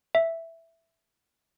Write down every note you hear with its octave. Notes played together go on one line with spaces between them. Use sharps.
E5